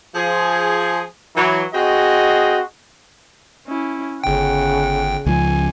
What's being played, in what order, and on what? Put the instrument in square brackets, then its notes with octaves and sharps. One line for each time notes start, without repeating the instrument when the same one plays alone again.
[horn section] F3 G#4
E3 F#3
C4 F#4 G#4 D#5
[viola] C#4 E4
[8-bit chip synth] G1 G5 [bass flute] C#3 [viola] F#5
[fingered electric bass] C#2 F3 [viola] G#5